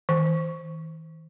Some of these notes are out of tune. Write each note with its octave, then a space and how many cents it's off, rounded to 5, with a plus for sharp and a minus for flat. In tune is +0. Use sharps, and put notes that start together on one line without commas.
E3 -45